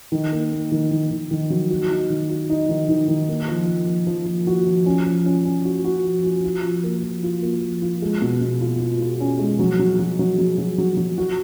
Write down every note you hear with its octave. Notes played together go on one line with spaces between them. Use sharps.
D#3
A#3
A#3
D#3
D#3
D#3
D#3
F#3
F#4
D#4
D#3
F#4
D#4
D#3
D#3
D#3
A#3
F3
F3
F3
F3
F3
F#4
F3
C#4
F3
C#4
C#4
F#4
F#4
F3
F#4
F4
F3
A#3
F3
F4
A#3
F3
F4
G#3
B2
B2
F4
F4
F4
C#4
G#3
F#3
F#3
F#3
F#3
F#3
F#3
F#3
F#3
F#4